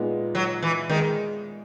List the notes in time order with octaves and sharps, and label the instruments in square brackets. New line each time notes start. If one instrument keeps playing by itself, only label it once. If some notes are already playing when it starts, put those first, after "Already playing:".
Already playing: [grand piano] A#2 G#3 B3 D#4
[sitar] F#3
E3
[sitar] D#3 [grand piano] G#3